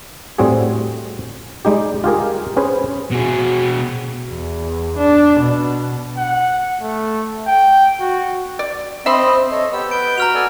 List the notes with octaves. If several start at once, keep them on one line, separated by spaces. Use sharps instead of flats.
A2 G3 C4 F#4 G#4
G3 G#3 D#4 G4
F4 G4 G#4 A#4
C#4 G#4 B4 C5
B2 F#4 G#4
E2
D4
B2
F#5
A3
G5
F#4
D5
C4 D#5 E5 B5 C6
A4 C#5 D#5
B3 G4 E6
B4 G6 D7
F#4 A#5 F6 F7
A4 D5 G#5